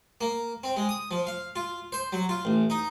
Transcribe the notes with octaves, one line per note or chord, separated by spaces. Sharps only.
A#3
C4
G#3
D#6
F3
F5
F4
C5
F#3
F4
A1
D#4